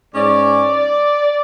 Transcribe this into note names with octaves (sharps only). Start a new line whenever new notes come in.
G#2 G#3 C#4 D5